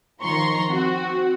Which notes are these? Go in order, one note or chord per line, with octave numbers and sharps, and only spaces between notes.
D#3 F3 A#5 C6 C#6
C4 F#4